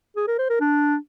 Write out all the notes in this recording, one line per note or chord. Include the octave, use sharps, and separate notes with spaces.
G#4
A#4
C5
A#4
D4